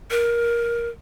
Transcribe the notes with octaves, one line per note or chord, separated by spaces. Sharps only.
A#4